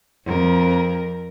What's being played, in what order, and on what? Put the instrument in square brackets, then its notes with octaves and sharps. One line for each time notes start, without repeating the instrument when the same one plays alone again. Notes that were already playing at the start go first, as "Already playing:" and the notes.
[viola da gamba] F2 A#4